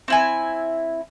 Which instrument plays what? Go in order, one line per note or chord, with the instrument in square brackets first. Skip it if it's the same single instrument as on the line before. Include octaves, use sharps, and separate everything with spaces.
[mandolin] C4 E4 G#5